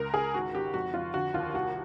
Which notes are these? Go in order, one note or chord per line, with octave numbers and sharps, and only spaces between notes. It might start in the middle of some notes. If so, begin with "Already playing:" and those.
Already playing: C#2 A#4
C#2 G#4
G#1 F#4
G#1 G4
F2 F#4
F2 F4
D3 F#4
D#2 F4
C2 F#4